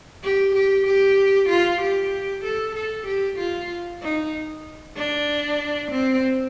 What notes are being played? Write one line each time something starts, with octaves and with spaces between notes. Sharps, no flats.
G4
G4
G4
F4
G4
A4
A4
G4
F4
D#4
D4
C4